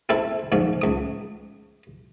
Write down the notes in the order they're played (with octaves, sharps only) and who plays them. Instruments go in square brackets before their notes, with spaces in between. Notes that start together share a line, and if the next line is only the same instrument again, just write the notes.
[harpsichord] C4 C#4 E4 A4
G#2 D3 F3 C#4
C#2 D#6